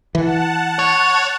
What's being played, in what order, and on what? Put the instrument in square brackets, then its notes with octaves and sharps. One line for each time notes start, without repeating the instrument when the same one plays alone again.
[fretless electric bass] E3 [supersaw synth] F#5 A5
[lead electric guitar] C#5